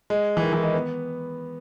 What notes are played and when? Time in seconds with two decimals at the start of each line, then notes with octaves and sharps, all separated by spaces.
0.10 G#3
0.37 E3
0.42 D#3
0.53 E3
0.63 G#3
0.74 B3